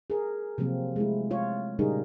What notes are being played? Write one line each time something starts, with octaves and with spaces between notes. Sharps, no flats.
G#4 A#4
C3 F3 F#3 A#3 C4
G#3 A3 E4
F4 C#5
A#2 C#3 G3 D#4 G#4 A#4